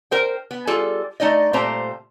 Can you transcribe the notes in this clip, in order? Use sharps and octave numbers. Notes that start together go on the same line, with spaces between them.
A#4 C5 G5
B3
G3 F4 G#4 A4
A3 D#4 D5 D#5
A#2 G3 A3 C4 C5 A#5